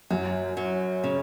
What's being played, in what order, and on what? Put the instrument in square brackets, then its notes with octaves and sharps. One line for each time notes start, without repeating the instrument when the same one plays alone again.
[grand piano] F#2 [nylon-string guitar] F#3
[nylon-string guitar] F#3
C#3